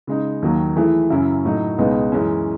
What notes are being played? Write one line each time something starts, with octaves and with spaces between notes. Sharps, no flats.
C#3 G#3 D#4
D#2 D#3 F#3
E3 A3 E4 G#4
F#2 C#3 F#3 C#4 E4
A2 F#3 A3 D#4
C#2 B2 G#3 B3 D#4
F#2 E3 G#3 C#4